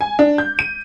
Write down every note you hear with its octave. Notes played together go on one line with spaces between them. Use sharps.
G#5
D4
G6
D#7